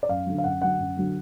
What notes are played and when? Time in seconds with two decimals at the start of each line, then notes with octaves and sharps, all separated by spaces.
0.03 D5
0.09 F#2 F5
0.26 D3 F#3
0.38 F5
0.44 F#2 F#5
0.62 D3 F#3 F#5
0.79 F#2
0.97 D3 F#3